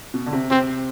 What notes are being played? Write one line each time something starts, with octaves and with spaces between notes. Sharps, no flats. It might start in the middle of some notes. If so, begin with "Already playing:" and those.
B2
D3
C3
C3 C4